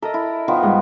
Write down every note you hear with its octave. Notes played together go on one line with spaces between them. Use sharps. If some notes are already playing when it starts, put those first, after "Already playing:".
A4 A#4 D#5 E5
E4
D#3 F3 B3
G#2 G3